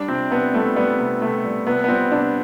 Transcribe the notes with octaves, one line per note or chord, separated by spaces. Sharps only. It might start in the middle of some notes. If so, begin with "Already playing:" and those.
Already playing: G3 D4
C3 C4
C3 B3
G3 A3
G3 B3
C3
C3 A3
G3
C3 B3
B3
G3 C4
C3 D4